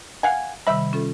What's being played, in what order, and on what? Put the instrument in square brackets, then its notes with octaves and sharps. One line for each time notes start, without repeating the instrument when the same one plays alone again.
[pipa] F5 F#5 G#5
[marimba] C3 D#3 G3 [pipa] E5 B5
[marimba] C#4 F4 A4